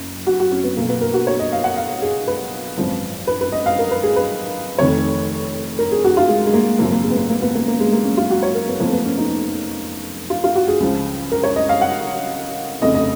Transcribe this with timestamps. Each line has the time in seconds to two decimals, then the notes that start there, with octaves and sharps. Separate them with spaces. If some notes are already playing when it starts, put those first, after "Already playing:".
Already playing: F#1 F#2
0.27 F#4
0.40 F#4
0.51 C#4
0.64 B3
0.76 B1 B2 A#3
0.89 B3
1.01 A#4
1.14 F#4
1.27 C#5
1.39 D#5
1.52 F5
1.64 F#5
1.77 F5
2.02 G#4
2.27 B4
2.78 G#1 F#2 F3
3.27 B4
3.41 B4
3.52 D#5
3.66 F5
3.79 A#4
3.91 B4
4.03 G#4
4.16 B4
4.78 F1 F2 D#3 C#5
5.79 A#4
5.92 G#4
6.04 F#4
6.17 F4
6.28 G#3
6.47 G#3
6.54 A#3
6.79 G#1 F#2 C#3 F3 A#3
6.92 A#3
7.04 G#3
7.11 B3
7.16 A#3
7.29 A#3
7.41 B3
7.55 A#3
7.68 A#3
7.80 G#3
7.92 A#3
8.04 C#4
8.17 F4
8.30 F#4
8.42 C#5
8.55 A#4
8.68 B3
8.80 F1 F2 F3 A#3
8.92 B3
9.05 C#4
9.18 D#4
10.30 F4
10.44 F4
10.55 F#4
10.68 G#4
10.80 C#2 C#3 F3
11.31 A#4
11.43 C#5
11.56 D#5
11.69 F5
11.81 F#5
12.82 F1 F2 C#3 D#5
12.94 D#5